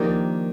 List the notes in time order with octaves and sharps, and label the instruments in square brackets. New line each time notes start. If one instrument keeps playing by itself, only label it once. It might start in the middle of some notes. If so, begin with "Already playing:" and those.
Already playing: [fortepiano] D#3 [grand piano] F3 A#3 D4 G4